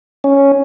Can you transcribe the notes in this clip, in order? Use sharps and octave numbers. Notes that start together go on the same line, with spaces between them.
C#4